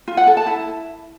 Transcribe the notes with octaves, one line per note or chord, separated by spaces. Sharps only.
F4
F#5
A4
A5
E4